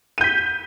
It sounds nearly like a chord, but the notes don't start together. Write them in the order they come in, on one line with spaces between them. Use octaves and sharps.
D#7 G6 B6